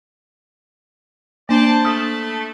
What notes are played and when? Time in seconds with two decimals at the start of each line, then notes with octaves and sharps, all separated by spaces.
1.49 A#3 D4 C5 D5 A5
1.85 A3 A5 B5 D#6 F6